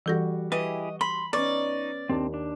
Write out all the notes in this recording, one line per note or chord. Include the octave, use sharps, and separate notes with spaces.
E3 G3 F#4 A4 A#6
E4 G4 G#4 B4 D#5
B5 C6
B3 C#4 D#4 D5 C#6
D#2 D#3 C4 D4
D4